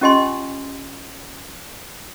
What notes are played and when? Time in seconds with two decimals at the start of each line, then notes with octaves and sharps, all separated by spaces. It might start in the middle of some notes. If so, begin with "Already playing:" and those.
0.01 C#4 F4 G4 D#5 G#5 C6